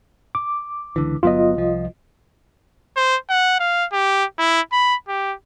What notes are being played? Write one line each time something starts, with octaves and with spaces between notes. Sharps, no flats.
D6
C#2 D3 E3
G1 F#3 B3 F4 D#5
C2 F3
C5
F#5
F5
G4
E4
B5
G4